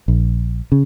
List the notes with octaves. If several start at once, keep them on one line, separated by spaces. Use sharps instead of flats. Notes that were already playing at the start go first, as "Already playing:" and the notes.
A#1
C#3